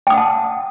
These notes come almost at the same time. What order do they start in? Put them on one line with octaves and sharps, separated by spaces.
G5 D#6 F#5 A5